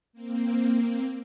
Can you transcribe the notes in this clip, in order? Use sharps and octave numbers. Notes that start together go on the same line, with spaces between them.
A#3 C4